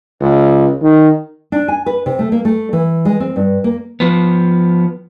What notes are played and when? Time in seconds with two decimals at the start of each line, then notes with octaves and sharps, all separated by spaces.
0.21 C#2
0.82 D#3
1.52 D4
1.68 G#5
1.86 B4
2.06 C3
2.19 A3
2.32 A#3
2.45 A3
2.73 E3
3.05 G#3
3.20 C4
3.36 G2
3.64 A#3
4.00 F3 B3